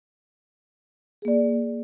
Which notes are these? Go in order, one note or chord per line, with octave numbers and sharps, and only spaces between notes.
A#3 G#4 D5